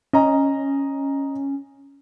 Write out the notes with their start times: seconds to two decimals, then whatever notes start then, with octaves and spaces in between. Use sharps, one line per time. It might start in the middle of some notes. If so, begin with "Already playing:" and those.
0.13 C#4 D#5 A#5